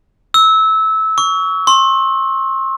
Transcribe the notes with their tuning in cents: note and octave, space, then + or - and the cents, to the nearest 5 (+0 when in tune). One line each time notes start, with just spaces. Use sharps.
E6 -20
C#6 +30
C6 +40